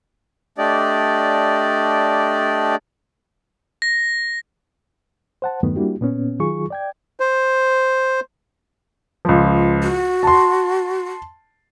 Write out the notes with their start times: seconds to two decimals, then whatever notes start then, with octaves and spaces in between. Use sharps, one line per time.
0.58 A3 D4 G4 D5 D#5
3.82 A#6
5.42 C5 F#5 A5
5.63 E2 G2 D#3 F#3 A3 B3
5.76 G3 A#3 D4 E4 F#4 G4
6.01 A#2 B3 C#4
6.40 D#3 F#3 F4 G#4 C#6
6.70 D5 G5 G#6
7.20 C5
9.25 C#2 F3
9.83 F#4
10.23 A5 C6